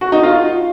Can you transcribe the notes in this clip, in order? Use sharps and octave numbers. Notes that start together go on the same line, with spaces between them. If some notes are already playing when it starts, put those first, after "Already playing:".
F#4
D#4
F4